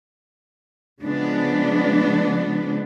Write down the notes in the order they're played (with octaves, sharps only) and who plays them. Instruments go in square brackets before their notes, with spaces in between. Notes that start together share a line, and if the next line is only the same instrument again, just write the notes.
[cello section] C#3 F3 G#3 B3 D4